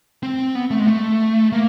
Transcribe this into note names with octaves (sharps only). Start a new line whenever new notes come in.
C4
B3
A3
G#3
A3
A#3